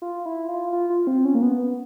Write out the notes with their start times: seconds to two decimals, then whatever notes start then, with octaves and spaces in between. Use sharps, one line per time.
0.02 F4
0.26 E4
0.49 F4
0.73 F4
0.90 F4
1.07 C4
1.25 C#4
1.35 A#3
1.42 B3